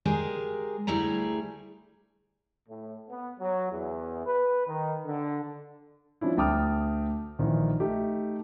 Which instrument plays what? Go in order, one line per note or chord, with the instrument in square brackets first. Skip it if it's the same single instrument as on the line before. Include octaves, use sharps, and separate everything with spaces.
[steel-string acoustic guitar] G#3 G4 G#4 A#4 D5
D2 G3 A3 E4 G#4 A#5
[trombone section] A2
B3
F#3
E2
B4
D#3
D3
[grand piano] F3 C#4 D4 E4
D2 G5 A5 D6 D#6 F6
A#1 D#3 E3
A3 D#4 G4